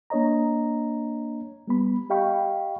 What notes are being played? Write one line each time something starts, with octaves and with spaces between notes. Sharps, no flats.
A#3 D4 C#5 D#5 A#5
G3 B3 B5
G4 D#5 F5 G5 B5 C#6